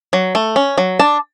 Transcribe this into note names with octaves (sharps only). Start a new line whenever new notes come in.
F#3
A3
C#4
F#3
D4 A5